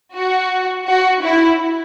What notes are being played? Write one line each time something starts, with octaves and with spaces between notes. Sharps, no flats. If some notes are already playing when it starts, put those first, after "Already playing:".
F#4
F#4
E4